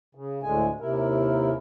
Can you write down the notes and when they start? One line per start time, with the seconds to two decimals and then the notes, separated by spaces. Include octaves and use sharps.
0.15 C#3
0.43 D2 A2 D3 G#3 G#5
0.80 D#2 C3 E4 A#4